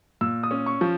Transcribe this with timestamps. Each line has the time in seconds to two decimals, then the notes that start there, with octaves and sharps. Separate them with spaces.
0.21 A#2 E6
0.43 D#6
0.51 C#4
0.66 C#6
0.81 F3